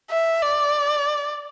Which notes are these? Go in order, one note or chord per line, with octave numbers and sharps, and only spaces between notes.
E5
D5